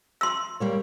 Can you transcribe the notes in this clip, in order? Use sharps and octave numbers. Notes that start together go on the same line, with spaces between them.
C6 E6
G3 A#3 C#5